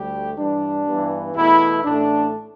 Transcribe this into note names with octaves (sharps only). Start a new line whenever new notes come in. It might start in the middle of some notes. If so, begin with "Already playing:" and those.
Already playing: D2 D3 G3 A3 G4
G2 E3 G3 D4
G2 E3 B3
E2 B2 A3 E4
A1 A2 A3 D4